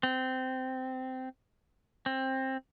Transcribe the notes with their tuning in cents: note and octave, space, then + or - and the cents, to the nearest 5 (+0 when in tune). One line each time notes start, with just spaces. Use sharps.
C4 -15
C4 +15